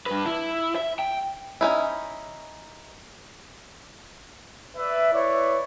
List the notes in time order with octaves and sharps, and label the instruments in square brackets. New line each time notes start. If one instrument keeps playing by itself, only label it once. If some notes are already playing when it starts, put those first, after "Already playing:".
[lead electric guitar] G2 B4
E4
E5
G5
[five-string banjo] C#4 D#4 E4
[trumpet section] B4 D5 E5
E4 B4 C#5 D5